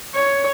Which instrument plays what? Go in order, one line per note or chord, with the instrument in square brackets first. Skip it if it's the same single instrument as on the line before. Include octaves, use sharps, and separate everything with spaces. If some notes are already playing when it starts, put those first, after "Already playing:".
[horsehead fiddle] C#5